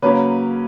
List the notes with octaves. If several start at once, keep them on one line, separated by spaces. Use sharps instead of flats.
C#3 F#3 A#3 C#4 B4